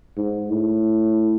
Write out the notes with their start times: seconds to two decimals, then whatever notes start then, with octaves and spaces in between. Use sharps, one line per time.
0.17 G#2
0.50 A2